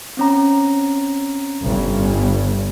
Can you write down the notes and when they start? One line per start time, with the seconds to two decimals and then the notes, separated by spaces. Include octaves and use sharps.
0.17 C4 C#4 A#5
1.63 G1 G2